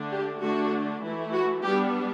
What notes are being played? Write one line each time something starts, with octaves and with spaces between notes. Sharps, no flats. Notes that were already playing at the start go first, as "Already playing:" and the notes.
Already playing: D3 A3 D4
G4
D3 A3 D4 F#4
E3 A3 E4
F#4
G3 B3 D4 G4